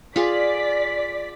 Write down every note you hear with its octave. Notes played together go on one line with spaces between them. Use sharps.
F4 G#4 D5 B6